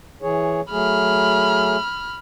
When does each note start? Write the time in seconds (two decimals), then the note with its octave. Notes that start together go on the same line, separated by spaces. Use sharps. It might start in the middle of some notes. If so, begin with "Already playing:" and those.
0.22 E3 G#4 C#5
0.71 F#3 A3 G#4 B5 F6